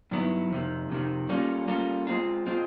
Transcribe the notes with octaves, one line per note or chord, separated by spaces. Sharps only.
G2 D#3 F#3 B3 E4
F2 C3 D#3
F2 C3 D#3
G3 A#3 C#4 F4 A4
G3 A#3 C#4 F4 A4
G#3 C4 F4
G#3 C4 F4